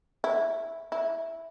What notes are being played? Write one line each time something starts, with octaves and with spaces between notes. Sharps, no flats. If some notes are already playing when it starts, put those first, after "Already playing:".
E4
E4